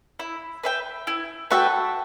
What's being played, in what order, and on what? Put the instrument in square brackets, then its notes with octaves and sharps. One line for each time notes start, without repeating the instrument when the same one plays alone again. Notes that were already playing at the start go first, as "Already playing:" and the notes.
[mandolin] E4
B4 E5 G5
E4
[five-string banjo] F#4 A4 [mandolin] B4 E5 G5